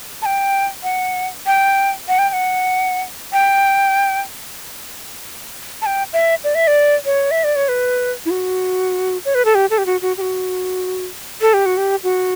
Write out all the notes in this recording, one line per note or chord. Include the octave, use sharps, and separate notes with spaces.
A5
G5
F#5
G5
F#5
G5
G5
F#5
G5
A5
G5
E5
D5
E5
D5
C#5
E5
D5
C#5
B4
E4
F#4
C#5
B4
A4
G4
A4
G4
F#4
F#4
G4
F#4
A4
G4
F#4
G4
F#4